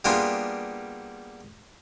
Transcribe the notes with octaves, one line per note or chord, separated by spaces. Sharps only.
G3 A#3 B3 D4 F4 G#4